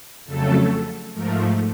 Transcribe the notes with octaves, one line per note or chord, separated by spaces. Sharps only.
F2 C#3 F#3 A3 A4
G#2 F3 A3 A#4